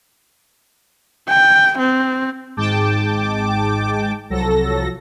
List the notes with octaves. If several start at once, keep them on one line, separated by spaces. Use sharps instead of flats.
G5
C4
G#1 G#2 G#3 G5 A5 D6
C2 F3 F#3 A4 A#6